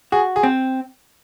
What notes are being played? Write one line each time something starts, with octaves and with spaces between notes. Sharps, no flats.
F#4 G#4
G#4
C4